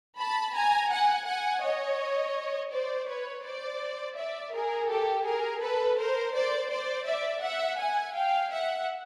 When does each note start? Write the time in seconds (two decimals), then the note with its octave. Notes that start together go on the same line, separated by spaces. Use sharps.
0.18 A5 B5
0.54 G#5 A#5
0.91 F#5 G#5
1.27 F#5 G#5
1.63 C#5 D#5
2.72 C5 D5
3.08 B4 C#5
3.44 C5 D5
4.17 D5 E5
4.53 G#4 A#4
4.89 G4 A4
5.25 G#4 A#4
5.61 A4 B4
5.97 A#4 C5
6.34 C5 D5
6.70 C5 D5
7.06 D5 E5
7.42 E5 F#5
7.78 F#5 G#5
8.15 F5 G5
8.51 E5 F#5